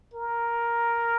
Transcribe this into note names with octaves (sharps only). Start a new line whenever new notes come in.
A#4